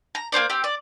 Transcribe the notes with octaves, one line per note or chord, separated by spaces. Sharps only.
A#5
A#3 C#4 C5 D5
C4 G4
D5